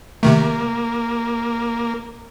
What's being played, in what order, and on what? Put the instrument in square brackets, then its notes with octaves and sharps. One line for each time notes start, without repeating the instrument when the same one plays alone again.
[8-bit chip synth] C3 D#3 A3 [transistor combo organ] A#3